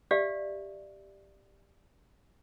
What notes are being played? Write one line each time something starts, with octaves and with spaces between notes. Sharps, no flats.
G4 D5 E5 F5